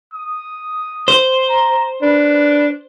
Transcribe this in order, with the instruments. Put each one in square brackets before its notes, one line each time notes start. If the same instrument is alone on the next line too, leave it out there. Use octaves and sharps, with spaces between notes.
[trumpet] D#6
[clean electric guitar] C5
[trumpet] A#5
[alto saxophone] D4 [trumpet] B4